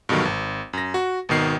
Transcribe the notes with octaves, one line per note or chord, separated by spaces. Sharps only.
G2 B2 D3 D#3 F#3
G#1
F#2 A#6
F#4
G#1 B2 D#3 C7